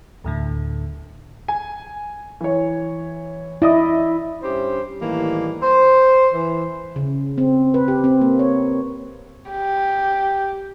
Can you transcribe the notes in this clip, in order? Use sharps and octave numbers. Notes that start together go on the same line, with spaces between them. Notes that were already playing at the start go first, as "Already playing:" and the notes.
D2 A2 D3
G#5
E3 C#5
E4 D5 D#5 D#6
G2 C#4 G4 C5
A2 D#3 E3 G3 A#3
C5
E3
C#3
C4
B4
G4
C4
A#3
C#5
G4